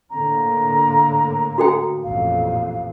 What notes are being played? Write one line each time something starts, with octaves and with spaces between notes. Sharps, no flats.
A2 D3 A#3 A#5
F#4 A4 G5
A1 F2 A#2 F5